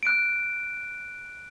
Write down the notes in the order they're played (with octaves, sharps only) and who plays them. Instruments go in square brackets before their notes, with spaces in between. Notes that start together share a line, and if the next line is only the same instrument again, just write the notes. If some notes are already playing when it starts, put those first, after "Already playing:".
[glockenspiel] F#6 D7